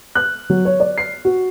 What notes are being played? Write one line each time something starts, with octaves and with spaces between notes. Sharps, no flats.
F#6
F#3
C#5
D5
C7
F#4